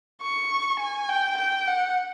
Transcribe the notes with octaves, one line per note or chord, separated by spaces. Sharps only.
C#6
G#5
G5
G5
F#5